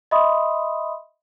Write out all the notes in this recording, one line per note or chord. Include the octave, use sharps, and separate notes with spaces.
D#5 E5 B5 C6 D#6